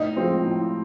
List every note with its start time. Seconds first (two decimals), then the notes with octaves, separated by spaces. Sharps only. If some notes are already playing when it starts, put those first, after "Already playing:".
Already playing: A2 D#4
0.16 F3 G#3 C4
0.45 A2